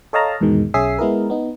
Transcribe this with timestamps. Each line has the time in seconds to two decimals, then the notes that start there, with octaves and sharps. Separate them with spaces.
0.13 A4 C#5 D#5 F5 A5 A#5
0.41 E2 G#2 B2 D#3 G#3
0.74 B1 C#4 G#4 E5 D#6 C7
0.99 G#3 B3 E4 G#4 A#4
1.30 B3 D#4